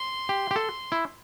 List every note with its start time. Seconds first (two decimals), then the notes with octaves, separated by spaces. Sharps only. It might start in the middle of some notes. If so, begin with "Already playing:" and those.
Already playing: C6
0.29 G4
0.51 G4
0.56 A4
0.92 E4